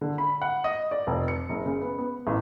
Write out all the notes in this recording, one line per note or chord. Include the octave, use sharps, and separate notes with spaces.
D3
B5
F#5
D#5
D5
F1
C#7
F#1
C#3
B3
B3
A1